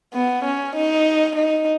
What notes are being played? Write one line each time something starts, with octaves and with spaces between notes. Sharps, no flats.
B3
C#4
D#4
D#4